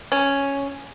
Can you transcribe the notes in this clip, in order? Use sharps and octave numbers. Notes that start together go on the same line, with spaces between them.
C#4